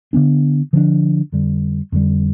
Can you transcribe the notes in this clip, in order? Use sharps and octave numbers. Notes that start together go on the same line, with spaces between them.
D3 F3 B3 D4
D3 F3 B3 D4
F2 D3 G3
F2 D3 G3